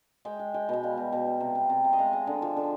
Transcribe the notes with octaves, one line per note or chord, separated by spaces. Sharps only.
G#3 G5
G#3
G#3 G5
B2 G5
G3 F5
B2
B2
G3
C3
C3
C3
C3
D#5
G#3 F5
G#3
D3
F3
D3